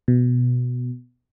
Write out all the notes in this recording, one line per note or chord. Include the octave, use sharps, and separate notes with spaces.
B2